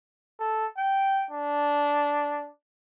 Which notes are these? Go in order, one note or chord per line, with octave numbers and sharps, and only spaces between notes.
A4
G5
D4